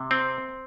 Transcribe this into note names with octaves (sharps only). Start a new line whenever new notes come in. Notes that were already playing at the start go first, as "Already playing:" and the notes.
Already playing: C3
C4